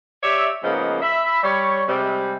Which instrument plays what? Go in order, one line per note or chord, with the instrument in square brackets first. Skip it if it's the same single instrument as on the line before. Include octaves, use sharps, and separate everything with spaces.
[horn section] G4 C#5 D5 E5
C#3 F3 G#3 A#3 B3 D#4
E5 B5
G3 C#5
C3 G3 G#3